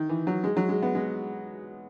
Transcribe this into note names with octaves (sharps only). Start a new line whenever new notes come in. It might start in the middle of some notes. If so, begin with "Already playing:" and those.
Already playing: D#3
E3
F#3
G#3
F#3
G#3
B3
G#3